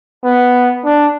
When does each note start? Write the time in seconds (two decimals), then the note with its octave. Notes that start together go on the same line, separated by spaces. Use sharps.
0.24 B3
0.85 D4